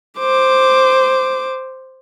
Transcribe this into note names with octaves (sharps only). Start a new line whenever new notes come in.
C5 D6